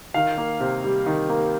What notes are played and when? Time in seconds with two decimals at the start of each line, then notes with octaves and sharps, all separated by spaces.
0.14 D#3 F5
0.38 A#3
0.60 C3
0.84 G3
1.06 D#3
1.29 A#3